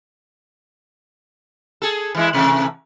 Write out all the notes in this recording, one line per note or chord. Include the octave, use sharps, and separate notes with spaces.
G#4 A4
E3 G#3 E4
C3 E3 A3